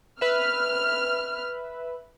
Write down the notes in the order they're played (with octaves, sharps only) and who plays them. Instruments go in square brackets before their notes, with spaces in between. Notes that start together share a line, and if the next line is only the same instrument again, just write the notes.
[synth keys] B4 E5 [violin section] F6